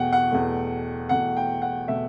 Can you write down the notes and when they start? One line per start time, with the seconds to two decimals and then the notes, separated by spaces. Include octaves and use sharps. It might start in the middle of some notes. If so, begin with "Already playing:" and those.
Already playing: E2 B2 A3 F#5 G5
0.13 F#5
0.32 E2 B2 A3
1.09 E2 B2 A3 F#5
1.37 G5
1.62 F#5
1.88 B2 A3 E5